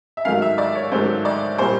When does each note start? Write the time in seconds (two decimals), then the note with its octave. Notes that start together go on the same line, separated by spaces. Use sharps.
0.17 E5
0.25 G#2 D#3 F#3 A3 F5
0.42 E5
0.58 D5
0.75 C#5
0.92 G#2 D#3 F#3 A3 C5
1.25 D5
1.58 A#2 G3 C5